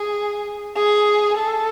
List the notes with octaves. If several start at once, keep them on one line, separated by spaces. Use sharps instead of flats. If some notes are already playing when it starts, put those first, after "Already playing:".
Already playing: G#4
G#4
A4